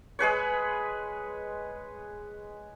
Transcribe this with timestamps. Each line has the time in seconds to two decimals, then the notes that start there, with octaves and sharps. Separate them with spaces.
0.19 G#3 G#4 B4 C#5